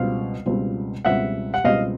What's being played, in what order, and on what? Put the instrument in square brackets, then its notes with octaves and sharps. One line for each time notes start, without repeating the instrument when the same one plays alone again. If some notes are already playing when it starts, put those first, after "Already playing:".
Already playing: [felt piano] C#2 B2 G3 C4 F4 [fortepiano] F5
[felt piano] C#2 B2 G3 C4 F4
[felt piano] C#2 B2 G3 C4 F4 [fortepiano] E5 F#5
[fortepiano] F#5
[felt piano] C#2 B2 G3 C4 F4 [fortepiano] D#5 F5